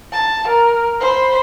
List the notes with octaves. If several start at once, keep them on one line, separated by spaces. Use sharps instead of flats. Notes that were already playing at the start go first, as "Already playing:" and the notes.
A5
A#4
C5 B5